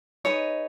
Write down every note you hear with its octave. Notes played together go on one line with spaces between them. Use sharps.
D#4 G#4 B4 C#5 D#5